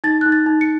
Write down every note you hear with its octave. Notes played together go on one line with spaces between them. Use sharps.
D#4 A6
D#4 F#6
A6
D#4
C#7